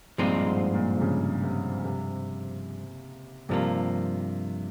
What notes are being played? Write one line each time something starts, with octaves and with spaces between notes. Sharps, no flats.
G2 A#2 F3 G#3 C4 D#4
G#2
A#2
C3
C#3
C3
C3
G2 C3 F3 A#3